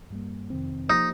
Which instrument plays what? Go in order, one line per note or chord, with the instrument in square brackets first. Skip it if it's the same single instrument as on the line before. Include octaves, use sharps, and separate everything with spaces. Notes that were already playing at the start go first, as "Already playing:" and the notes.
[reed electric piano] G2 G3 A#3
F2 C3 D#3 C4
[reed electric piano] F3 A#3 G4 C5 [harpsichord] D#4